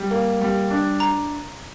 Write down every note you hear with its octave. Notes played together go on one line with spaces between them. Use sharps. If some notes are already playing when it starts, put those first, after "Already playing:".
Already playing: G3
A#3
G3
D4
A#5